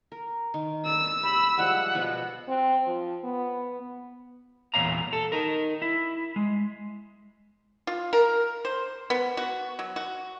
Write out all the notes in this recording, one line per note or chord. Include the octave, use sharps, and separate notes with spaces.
A#4
D#3
D5 B5 E6
G4 B5
F3 G3 G#3 F#5
B2 F3 B5
C4
F3
B3
E2 A#2 C#5 F5 A#5
A4
D#4 A#4
E4
G#3
F4
A#4
C5
B3
F#4
F#3
F#4